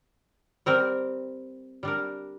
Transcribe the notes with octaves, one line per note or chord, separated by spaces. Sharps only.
G3 C4 A#4
G3 D4 A#4